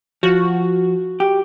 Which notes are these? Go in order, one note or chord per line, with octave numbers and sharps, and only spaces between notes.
F3 F#4
G4